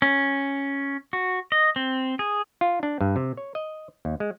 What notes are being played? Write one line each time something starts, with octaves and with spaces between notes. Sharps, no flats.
C#4
F#4
D#5
C4
G#4
F4
D4
G2
C3
C#5
D#5
D#2
G#3